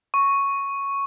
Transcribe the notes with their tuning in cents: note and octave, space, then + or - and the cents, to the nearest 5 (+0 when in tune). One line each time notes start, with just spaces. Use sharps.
C#6 +0